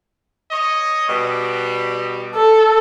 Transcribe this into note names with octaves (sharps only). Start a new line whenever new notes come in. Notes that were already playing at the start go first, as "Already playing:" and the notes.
C#5 D#5
B2 G3
A4